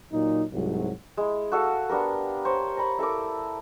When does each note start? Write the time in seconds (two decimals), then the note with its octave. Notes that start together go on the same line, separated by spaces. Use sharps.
0.13 A#2 F#3 D#4
0.53 C2 G#2 F#3
1.17 G#3 E4
1.52 F#4 A4 F5
1.89 B3 D4 G4 A#4
2.45 C5 C#5 A#5
2.77 A#5 B5 C#6
2.98 E4 A4 A#4 D6